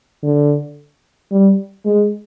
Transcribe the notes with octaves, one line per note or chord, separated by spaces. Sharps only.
D3
G3
G#3